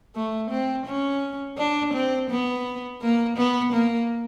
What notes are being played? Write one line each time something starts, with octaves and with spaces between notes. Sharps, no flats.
A3
C4
C#4
D4
C4
B3
A#3
B3
A#3